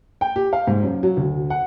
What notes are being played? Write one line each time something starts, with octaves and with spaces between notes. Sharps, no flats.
G5
G4
F5
G#2
F#2
F#3
D2
F#5